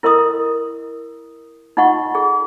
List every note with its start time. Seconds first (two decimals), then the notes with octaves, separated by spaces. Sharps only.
0.03 E4 A#4 D#5 C6 D#6
1.77 D#4 F4 D#5 F#5 C6 C#6
2.15 G#4